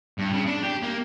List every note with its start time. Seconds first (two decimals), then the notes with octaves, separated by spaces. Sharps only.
0.19 G2
0.33 C#3
0.47 D4
0.64 G4
0.83 A#3